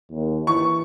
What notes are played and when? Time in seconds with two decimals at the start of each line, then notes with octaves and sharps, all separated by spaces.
0.11 D#2
0.47 E3 C#6